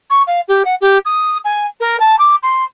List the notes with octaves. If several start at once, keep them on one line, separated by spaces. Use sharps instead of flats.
C#6
F5
G4
F#5
G4
D#6
G#5
A#4
A5
D6
C6